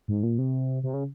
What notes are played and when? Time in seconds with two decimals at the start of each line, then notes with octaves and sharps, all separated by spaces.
0.08 G#2
0.23 A#2
0.38 C3
0.83 C3
0.94 C#3